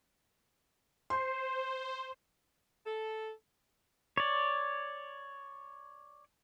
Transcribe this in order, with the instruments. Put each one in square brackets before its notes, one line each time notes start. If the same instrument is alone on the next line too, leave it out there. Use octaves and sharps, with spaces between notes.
[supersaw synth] C5 [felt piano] C6
[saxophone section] A4
[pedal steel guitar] C#5 D5